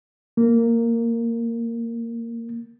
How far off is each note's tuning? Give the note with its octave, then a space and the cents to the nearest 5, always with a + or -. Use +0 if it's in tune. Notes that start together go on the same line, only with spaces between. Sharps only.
A#3 -10